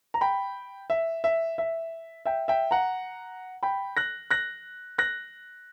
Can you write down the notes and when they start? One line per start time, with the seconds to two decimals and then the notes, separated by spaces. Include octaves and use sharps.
0.14 A#5
0.21 G5 B5
0.90 E5
1.24 E5
1.58 E5
2.25 E5 G5
2.48 E5 G5
2.71 F#5 A#5
3.63 G5 B5
3.97 F#6 A#6
4.31 F#6 A#6
4.98 F#6 A#6